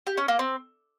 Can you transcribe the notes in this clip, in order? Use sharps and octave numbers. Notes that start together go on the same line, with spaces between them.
G4
C#4
A#3
C4